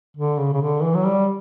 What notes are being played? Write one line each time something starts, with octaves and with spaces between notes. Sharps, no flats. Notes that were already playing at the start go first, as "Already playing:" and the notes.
D3
C#3
C#3
D3
E3
F#3
G3